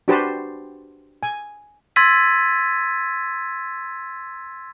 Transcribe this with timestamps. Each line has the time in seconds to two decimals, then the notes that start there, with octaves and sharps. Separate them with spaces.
0.08 D4 F#4 G4 B4 C5 A5
1.23 G#5
1.96 C6 E6 G#6 A6 B6 D#7